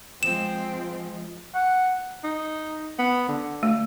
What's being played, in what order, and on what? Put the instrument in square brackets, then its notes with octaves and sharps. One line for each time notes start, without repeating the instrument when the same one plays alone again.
[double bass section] F3 G#3 [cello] C4 [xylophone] E7
[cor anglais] F#5
[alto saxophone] D#4
B3
D3
[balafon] A3